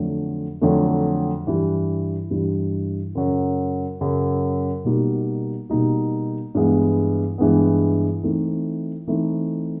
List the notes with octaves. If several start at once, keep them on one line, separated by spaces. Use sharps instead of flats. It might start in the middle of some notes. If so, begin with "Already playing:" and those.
Already playing: F2 D3 F#3 A3
F2 D3 F#3 A3
G2 E3 G3
G2 E3 G3
F#2 C#3 F#3
F#2 C#3 F#3
B2 G3 A#3 D#4 F#4
B2 G3 A#3 D#4 F#4
G2 E3 G#3 B3
G2 E3 G#3 B3
E3 A3 C4 D#4
E3 A3 C4 D#4